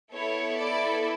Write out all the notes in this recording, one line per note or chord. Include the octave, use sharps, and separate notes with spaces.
B3 E4 A4 C#5
D5